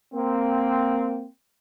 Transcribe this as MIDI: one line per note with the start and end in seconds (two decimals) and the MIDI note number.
0.14 1.26 58
0.14 1.26 60